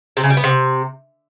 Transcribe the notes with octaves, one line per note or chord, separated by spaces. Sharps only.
C3
C#3
G3
B3
C3